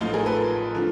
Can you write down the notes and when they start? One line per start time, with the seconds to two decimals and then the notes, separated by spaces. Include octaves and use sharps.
0.01 A1 A2 F3 D#4 F4
0.13 G#4 A#4
0.26 A4 B4
0.75 D3 F3